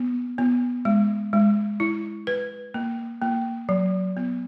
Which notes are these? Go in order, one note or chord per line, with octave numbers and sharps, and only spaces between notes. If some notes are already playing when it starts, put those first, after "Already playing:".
Already playing: B3
B3
G#3
G#3
E4
B4
A#3
A#3
F#3
B3